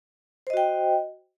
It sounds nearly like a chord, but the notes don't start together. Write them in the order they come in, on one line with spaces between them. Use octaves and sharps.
C5 D#5 F#4 G5